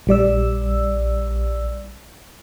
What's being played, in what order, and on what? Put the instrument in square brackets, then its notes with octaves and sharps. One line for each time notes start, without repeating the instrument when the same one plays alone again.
[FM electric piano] A#1 G3 D5 E6